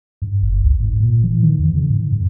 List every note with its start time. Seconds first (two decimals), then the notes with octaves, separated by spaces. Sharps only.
0.22 G2
0.42 G1
0.64 C#2
0.80 G#2
1.00 A#2
1.24 E3
1.43 D#3
1.59 F2
1.75 C#3
1.90 G#2
2.11 F#2